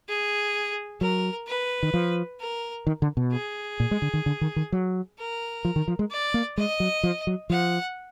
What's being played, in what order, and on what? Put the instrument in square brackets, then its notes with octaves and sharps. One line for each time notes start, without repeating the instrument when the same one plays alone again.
[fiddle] G#4
[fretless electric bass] F#3 [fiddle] A#4
[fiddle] B4
[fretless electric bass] D#3
F3
[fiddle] A#4
[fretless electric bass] D#3
D3
B2
[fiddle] G#4
[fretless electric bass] A#2
G#3
D3
D#3
D3
D#3
D#3
F#3
[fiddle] A#4
[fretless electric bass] F3
D#3
F3
G#3
[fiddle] D5
[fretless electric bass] A#3
[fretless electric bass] G#3 [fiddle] D#5
[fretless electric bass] F#3
F3
F#3
[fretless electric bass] F3 [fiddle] F#5